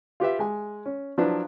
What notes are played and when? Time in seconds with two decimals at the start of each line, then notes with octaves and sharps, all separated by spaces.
0.20 F4 G4 B4 E5
0.39 G#3 G#5
0.86 C#4
1.18 F3 F#3 D4 E4 B4